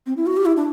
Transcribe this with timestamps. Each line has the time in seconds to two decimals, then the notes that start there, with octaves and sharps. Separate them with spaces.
0.06 C4
0.17 E4
0.26 F#4
0.37 G4
0.46 E4
0.57 D4